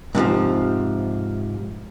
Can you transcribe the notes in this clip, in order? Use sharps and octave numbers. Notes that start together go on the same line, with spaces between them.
G#2 C3 D#3 F3